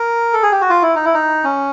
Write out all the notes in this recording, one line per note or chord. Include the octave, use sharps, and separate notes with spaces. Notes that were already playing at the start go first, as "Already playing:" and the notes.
Already playing: A#4
A4
G#4
G4
F#4
F4
E4
D#4
E4
D#4
C#4